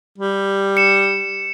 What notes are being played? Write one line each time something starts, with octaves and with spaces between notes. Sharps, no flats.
G3
C#7 E7